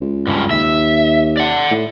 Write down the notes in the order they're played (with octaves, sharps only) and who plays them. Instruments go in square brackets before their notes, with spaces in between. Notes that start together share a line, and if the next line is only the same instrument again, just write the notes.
[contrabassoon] C#2
[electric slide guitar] G2 C#3
[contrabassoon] D#2 [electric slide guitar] E5
[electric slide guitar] D5 F#5
[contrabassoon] A2